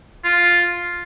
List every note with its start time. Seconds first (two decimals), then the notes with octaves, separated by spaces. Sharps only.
0.24 F4